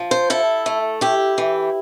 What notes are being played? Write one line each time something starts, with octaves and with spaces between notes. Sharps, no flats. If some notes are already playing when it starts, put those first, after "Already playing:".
Already playing: F3
C5
E4 A4
A3
E4 G4
E3